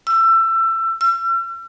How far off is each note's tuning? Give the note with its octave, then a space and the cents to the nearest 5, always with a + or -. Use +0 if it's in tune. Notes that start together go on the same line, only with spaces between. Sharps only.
E6 +25
E6 +45